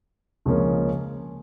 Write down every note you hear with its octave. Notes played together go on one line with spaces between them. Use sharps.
C#2 C#3 F3 A#3 C#4